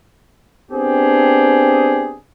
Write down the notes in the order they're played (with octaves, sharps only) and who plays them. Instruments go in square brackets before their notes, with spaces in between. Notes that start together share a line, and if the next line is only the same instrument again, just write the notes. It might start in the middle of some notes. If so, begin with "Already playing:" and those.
[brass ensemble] B3 C4 D4 G4 G#4